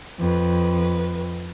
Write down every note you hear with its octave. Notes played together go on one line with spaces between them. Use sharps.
F2 B4